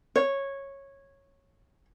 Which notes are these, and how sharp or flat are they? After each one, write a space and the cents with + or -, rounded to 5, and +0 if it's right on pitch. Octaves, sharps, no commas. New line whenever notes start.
C#5 -10